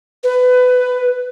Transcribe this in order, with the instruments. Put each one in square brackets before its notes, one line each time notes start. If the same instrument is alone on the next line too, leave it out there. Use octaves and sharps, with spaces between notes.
[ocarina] B4